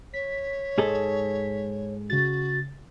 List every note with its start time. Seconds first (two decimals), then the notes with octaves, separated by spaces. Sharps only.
0.14 C#5 B6
0.78 G#2 G#4 A4
2.10 C#3 F#4 A6